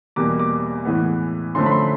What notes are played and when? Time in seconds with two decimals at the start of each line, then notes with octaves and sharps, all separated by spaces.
0.16 E2 B2 G3 A#3 D6
0.39 D6
0.85 A2 E3 G#3 B3
1.55 F#2 D3 F3 A3 C6
1.66 B5
1.72 C6